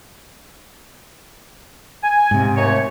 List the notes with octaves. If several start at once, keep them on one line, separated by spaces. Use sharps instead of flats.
G#5
G#2 C3
D#2 A3 C#5